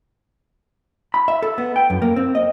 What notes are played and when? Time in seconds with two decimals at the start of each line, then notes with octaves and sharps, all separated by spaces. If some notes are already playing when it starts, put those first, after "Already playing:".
1.14 B5
1.28 E5
1.42 A4
1.58 B3
1.76 G5
1.90 F#2
2.02 A#3
2.16 C4
2.35 D#5